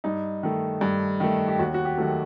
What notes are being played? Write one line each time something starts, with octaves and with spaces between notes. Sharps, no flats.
G2 D#4
D#3 A3
G2
D#3 A3
G4
D#2 F#4
F#4
G4
D#3 F#3 A3